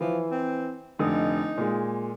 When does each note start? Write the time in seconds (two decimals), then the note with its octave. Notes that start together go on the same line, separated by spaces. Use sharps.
0.01 E3 F3
0.30 C4
0.99 F1 D3 D#4 D#6
1.58 A#2 G#3